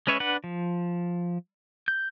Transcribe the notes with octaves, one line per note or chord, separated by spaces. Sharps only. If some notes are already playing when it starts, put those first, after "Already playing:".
G#3 C#4 B4 C#5 E5
D4 B4 F#5
F3
G6